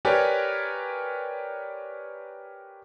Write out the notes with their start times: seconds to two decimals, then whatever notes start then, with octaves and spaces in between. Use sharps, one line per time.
0.05 G4 A#4 B4 C#5 D5 G#5